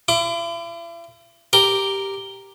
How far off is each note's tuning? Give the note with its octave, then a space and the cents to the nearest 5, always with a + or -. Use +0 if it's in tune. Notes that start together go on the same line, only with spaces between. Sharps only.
E4 +45 D6 +0
G4 +0 A#4 +0